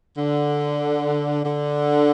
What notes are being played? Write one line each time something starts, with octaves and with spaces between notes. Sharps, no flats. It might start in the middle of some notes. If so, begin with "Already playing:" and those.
D3
D3